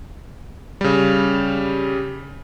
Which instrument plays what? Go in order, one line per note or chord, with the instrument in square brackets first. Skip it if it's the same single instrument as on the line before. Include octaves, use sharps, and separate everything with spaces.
[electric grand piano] C#3 G3